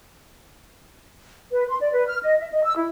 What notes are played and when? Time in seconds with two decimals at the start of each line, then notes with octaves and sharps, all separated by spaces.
1.51 B4
1.69 C6
1.81 D5
1.93 B4
2.08 F6
2.22 D#5
2.39 E5
2.52 D#5
2.65 E6
2.77 E4